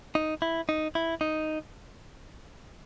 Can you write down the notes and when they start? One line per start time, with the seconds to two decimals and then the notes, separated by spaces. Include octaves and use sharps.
0.15 D#4
0.42 E4
0.69 D#4
0.95 E4
1.21 D#4